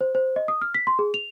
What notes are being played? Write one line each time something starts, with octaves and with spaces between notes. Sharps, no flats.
C5
C5
D#5
D#6
F6
B6
C6
G#4
F7